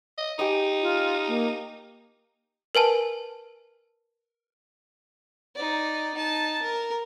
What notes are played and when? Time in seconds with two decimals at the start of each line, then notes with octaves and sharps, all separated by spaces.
0.18 D#5
0.39 D#4 G4 G#4 D#5
0.82 F4
1.28 A#3
2.75 A#4 B4 G#5 A5
5.55 D#4 D5
6.14 D#4 A5
6.62 A#4